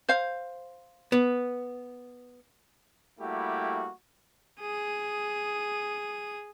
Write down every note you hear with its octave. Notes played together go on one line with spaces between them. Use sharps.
C5 F5
B3
G3 A3 A#3 E4 F#4 G4
G#4 D#6